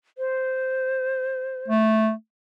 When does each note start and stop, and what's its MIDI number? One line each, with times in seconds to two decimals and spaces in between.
0.18 1.70 72
1.68 2.12 57